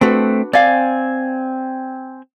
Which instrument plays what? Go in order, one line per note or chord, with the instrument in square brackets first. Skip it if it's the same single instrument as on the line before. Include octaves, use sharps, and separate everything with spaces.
[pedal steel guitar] A3 C4 [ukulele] D4 F#4 B4
[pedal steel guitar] C4 G#5 [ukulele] D5 F5